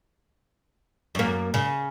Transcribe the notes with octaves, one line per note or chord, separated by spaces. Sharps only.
F#2 A#3
C#3